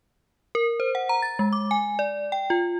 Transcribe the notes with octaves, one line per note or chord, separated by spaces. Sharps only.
A#4
C5
F#5
A#5
A6
G#3
D6
G#5
D5
G5
F4